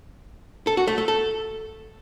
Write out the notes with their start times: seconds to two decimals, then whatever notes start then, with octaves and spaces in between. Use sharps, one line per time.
0.67 A4
0.77 F#4
0.88 A3
0.98 A3
1.08 A4